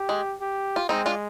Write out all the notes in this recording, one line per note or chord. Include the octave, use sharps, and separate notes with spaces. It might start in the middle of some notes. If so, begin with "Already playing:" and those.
Already playing: G4
G#3
G4
F4
G#3 C4 D#4
D4 F4